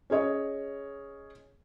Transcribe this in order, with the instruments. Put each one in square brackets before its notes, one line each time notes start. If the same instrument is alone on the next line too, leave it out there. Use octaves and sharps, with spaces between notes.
[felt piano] C#4 G#4 C#5 D#5